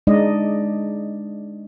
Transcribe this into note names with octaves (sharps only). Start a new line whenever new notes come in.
G#3 D4 D#4 D5 D#5